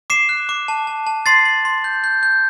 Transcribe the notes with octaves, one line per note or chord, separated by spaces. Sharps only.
D6 C7 E7
F#6
D6
A5
A5
A5
C6 A6 C7
C6
C6
G6
G6
G6